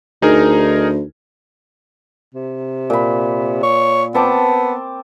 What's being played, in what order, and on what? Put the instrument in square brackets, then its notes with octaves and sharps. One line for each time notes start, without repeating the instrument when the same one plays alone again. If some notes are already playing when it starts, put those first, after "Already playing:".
[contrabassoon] D2 [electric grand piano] D#4 G#4 A#4
[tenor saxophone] C3
[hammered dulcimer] A#2 B5
[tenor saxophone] C#5
[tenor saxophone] B3 [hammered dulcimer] C4 A5 D6